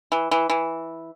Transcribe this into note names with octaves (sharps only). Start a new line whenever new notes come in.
E3
E3
E3